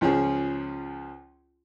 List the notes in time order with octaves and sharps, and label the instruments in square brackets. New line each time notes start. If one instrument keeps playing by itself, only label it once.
[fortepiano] C#2 F3 C#4 G#4